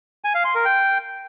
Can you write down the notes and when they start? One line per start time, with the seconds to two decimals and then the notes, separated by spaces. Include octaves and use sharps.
0.24 G#5
0.35 F5
0.45 C6
0.55 A#4
0.65 G5